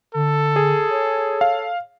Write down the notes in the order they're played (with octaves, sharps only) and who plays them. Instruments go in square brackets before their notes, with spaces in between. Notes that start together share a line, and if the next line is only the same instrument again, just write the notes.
[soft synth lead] D3 [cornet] A4
[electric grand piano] G#4
[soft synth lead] C#5
[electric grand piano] F5